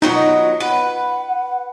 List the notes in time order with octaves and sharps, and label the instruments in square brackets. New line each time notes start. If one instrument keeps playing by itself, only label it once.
[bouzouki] B2 F#3 A#5 [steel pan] D#4 [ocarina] F4
[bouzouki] B4 [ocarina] F#5